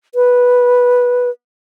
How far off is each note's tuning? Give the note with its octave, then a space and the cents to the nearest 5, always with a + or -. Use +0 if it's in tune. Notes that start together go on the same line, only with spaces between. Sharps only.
B4 -10